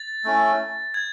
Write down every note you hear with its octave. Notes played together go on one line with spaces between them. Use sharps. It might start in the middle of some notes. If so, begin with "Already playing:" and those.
Already playing: A6
A3 C#4 E4
G#6